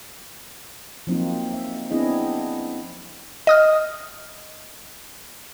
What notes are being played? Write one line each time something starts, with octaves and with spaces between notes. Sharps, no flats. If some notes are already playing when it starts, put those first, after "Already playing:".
F3 F#3 A#3 C4 D#4 F4
E5
B3 C4 D4 E4 G#4 D#5
D#5 D#6 F6